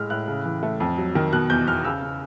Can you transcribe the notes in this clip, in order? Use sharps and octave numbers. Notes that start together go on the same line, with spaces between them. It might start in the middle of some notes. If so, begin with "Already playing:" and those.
Already playing: A2 G#3 F6
A2 F#6
C#3
E3
A3
F2
F#3
D#3
B2 F#6
E2 G6
E2 F6
C#3 E6
C#3